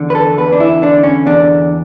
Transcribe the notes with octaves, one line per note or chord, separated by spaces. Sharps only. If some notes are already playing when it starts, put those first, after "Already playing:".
Already playing: E2 D3
B4
A4
E2 B4
D4
E4
D3 D4
C#4
E2 D4